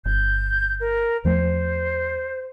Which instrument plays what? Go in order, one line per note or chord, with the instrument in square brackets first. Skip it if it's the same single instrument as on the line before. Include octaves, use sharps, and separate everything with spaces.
[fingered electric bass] G1 [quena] G6
[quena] A#4
[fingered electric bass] E2 F3 A3 [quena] C5